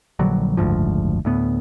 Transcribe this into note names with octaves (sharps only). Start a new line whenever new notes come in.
A#1 D3 F#3 G3
F#1 D2 G#2 F3
D2 A2 B3